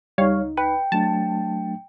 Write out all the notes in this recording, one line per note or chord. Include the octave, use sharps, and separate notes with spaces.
C#2 G3 D#4 C#5 F5
B4 G5
F#3 A3 D4 A5